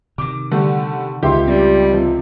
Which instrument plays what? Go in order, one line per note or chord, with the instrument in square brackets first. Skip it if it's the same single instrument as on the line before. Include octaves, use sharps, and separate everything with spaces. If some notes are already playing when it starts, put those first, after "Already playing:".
[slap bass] C3 D#3 [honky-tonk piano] D6
[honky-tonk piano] D3 G3 A3
[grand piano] C#2 E5 C6 [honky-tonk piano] G4
[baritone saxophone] G3 [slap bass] C4
[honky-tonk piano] C3 F3